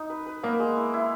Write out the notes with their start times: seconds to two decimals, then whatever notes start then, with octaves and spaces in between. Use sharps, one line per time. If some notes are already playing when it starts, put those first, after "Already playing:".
Already playing: D#4
0.10 B4
0.26 B4
0.43 A#3 B3
0.60 G#3
0.76 E4
0.94 E4